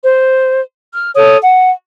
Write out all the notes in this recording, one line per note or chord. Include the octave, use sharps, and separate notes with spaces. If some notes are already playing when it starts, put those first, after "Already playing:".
C5
F6
A4 C#5 D#6
F#5